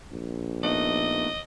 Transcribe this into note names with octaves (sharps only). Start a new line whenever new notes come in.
A#1
A3 B3 D#4 D#5